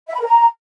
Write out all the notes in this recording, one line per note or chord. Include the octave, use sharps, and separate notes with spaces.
E5
B5
A#4
A#5